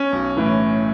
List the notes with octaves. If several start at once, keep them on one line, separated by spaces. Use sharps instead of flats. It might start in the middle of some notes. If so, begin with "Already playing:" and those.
Already playing: C#4
B1
A2 E3